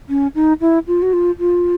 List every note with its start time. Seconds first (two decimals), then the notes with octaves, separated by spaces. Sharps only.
0.09 C#4
0.35 D#4
0.61 E4
0.87 F4
1.02 F#4
1.13 F4
1.39 F4